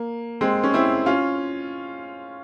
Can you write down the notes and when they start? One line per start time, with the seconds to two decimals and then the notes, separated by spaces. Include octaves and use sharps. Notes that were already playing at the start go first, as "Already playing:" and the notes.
Already playing: A#3
0.41 G#3 C4
0.63 C#4
0.74 C4 E4
1.06 C#4 F4